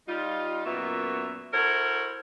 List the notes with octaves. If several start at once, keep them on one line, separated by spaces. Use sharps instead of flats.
G3 D#4 F4
F#2 A#2 B3 C#5 E5
E4 F#4 A4 A#4 C5 C#5